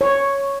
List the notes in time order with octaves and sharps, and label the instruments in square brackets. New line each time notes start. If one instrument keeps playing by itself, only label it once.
[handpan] C#5